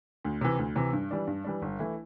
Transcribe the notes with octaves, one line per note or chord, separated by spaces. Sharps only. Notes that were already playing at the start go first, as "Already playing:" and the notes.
D2
C3 E3
D2
C3 E3
G2
E3 G3 D4
G2
E3 G3 D4
G1
E3 A3 E4